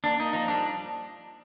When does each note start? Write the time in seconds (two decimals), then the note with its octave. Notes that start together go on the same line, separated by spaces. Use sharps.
0.04 A#3 D4
0.20 A#3 D#4
0.33 F3 D#4
0.48 G3 D4